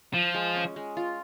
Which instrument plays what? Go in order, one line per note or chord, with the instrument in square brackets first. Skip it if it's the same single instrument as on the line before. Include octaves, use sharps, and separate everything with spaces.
[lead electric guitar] F3 [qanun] F4
[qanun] G#3
C#4
G#3
F4